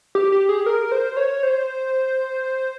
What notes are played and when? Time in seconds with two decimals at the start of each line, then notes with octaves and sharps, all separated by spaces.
0.15 G4
0.32 G4
0.49 G#4
0.66 A#4
0.92 C5
1.17 C#5
1.43 C5